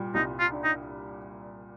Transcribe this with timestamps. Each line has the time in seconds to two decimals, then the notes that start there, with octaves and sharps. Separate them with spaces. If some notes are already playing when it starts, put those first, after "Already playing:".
Already playing: A#2 G3
0.14 C2 D#4
0.39 F4
0.52 D4
0.64 D#4